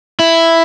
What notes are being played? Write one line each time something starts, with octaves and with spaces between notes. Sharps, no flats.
E4